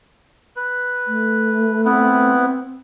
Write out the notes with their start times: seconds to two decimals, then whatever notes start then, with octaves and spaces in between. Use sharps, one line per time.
0.56 B4
1.07 A3
1.85 B3 C4 E4 B4